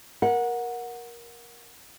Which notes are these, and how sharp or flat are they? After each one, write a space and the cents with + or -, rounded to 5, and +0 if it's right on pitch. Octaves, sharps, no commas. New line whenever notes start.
A#4 +15 F#5 -15